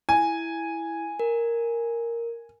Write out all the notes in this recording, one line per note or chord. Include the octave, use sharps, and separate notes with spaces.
E4 G#5
A#4